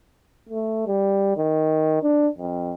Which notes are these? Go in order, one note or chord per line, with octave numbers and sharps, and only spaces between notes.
A3
G3
D#3
D4
F2